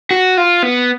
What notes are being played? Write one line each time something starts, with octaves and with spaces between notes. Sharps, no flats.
F#4
F4
B3